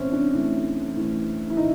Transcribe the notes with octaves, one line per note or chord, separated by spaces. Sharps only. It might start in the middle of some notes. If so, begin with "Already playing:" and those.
Already playing: A2 E3 A3 C4 C#4
D4
A2 E3 A3
A2 E3 A3
E4
A2 E3 A3 D#4